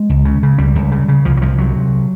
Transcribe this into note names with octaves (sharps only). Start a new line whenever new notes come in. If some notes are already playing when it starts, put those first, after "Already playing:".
Already playing: G#3
C#2
C#3
C#3
C#2 G3
C#2
C#3
C#3
C2 F3
F#3
C2 F3
C3 F#3
C3